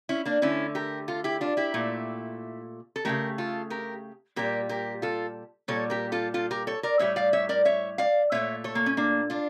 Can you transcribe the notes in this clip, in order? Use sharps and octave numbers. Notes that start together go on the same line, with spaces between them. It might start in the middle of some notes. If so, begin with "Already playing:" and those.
C#4 E4
A#3 D4
D3 A3 C#4 E4
G4 A#4
F4 A4
E4 G4
D4 F4
E4 G4
A#2 A3
A4
C#3 F3 A3 G4 A#4
F4 A4
G4 A#4
A#2 G3 G4 A#4
G4 A#4
F4 A4
A#2 G3 A4 C#5
G4 A#4
F4 A4
F4 A4
G4 A#4
A4 C#5
A#4 D5
A2 G3 C#5 E5
D5 F5
C#5 E5
A#4 D5
C#5 E5
D5 F5
A#2 A3 C#5 E5
A4 C#5
A#3
C#4
A#3 D4
D4 F4